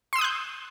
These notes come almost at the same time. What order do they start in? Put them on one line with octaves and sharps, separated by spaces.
C6 E6 D#6 F#6 G6